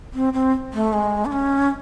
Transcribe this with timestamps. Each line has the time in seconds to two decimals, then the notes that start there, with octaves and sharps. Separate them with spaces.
0.14 C4
0.33 C4
0.74 A3
0.93 G#3
1.25 D4
1.32 C#4